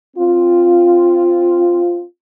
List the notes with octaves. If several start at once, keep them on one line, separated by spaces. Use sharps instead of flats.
C4 F4